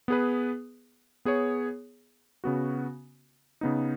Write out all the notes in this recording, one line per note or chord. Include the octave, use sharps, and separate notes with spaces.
B3 G#4 B4
B3 G#4 C#5
C#3 B3 F#4
C#3 B3 D#4